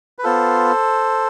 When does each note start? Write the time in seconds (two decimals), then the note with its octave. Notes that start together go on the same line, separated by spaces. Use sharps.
0.19 B4
0.24 B3 F4 A4 C5